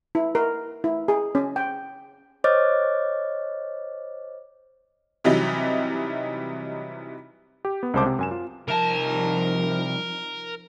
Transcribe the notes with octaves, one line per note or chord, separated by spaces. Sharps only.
E4
A#4
E4
G#4
C#4
G5
C5 C#5 D#5 D6 F6 A6
C3 E3 F#3 G3 D#4
G4
B3
C2 C#3 G#3 C5 A5 D6
C3
F#2 G#5 E7
F4
C2 F3 D#4 A#4 A5